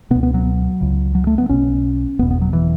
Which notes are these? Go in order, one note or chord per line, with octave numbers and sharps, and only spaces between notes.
C#2 B2 B3
B3
F#3
C#2 C#3
F#3
A3
B3
B1 B2 C#4
F#1 E2 B2 B3
B3
F#3
E3